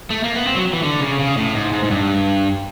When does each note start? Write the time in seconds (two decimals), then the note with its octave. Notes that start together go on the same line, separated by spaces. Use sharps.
0.10 A3
0.24 A#3
0.35 B3
0.47 C4
0.55 F#3
0.73 E3
0.83 D3
1.01 C#3
1.19 C#3
1.37 A2
1.55 G#2
1.73 G#2
1.83 G#2
1.91 G2